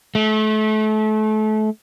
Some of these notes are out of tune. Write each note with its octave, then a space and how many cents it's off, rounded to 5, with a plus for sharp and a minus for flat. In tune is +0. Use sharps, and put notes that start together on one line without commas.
A3 -30